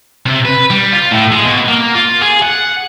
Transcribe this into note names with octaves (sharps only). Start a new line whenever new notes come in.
C3
B4
G3
F4
A2
G#3
B2
A#3
F4
G#4
F#5